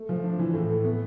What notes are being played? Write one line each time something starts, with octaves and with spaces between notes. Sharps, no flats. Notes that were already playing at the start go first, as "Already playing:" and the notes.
Already playing: A3
F3
D4
E3
A2
A3
B3